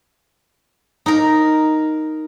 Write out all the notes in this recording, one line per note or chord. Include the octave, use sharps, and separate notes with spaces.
D#4 A#4